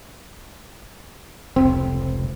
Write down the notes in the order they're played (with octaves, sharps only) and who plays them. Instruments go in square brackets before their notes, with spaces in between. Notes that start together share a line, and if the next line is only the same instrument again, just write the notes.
[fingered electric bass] F1 C#2 [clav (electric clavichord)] C4